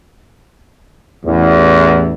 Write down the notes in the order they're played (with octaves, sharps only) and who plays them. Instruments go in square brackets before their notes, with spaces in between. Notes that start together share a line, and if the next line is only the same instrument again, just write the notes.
[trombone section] A1 E2